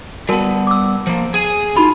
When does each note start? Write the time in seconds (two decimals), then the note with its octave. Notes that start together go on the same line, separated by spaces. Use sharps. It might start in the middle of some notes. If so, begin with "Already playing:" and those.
0.29 G3 B3 F#4 A#4 A5
0.67 D6 E6
1.07 F3 A#3
1.34 G#4 G#5
1.77 D#4 F4 F#4 B5